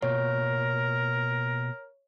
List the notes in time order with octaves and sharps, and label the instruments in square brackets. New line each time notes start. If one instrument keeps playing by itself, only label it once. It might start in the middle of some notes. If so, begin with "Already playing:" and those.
[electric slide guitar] B2 A#3 F4 [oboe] A#4 [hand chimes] C#5